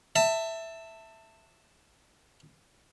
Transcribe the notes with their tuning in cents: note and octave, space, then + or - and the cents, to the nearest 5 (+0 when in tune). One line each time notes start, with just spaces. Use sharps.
E5 +0 A5 +25